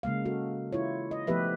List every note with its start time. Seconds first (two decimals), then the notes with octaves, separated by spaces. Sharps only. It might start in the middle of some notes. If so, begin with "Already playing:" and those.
0.03 C#3 G#3 A#3 F5
0.25 F#4 A4
0.72 E4 F4 C#5
1.11 D#5
1.27 F3 A3 B3 G4 B4 E5